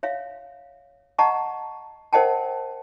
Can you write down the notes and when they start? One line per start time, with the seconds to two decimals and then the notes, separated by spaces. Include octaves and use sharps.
0.03 C#5 E5 F5
1.19 D#5 F#5 A5 A#5 C#6
2.13 A#4 C5 D#5 F#5 G5 A5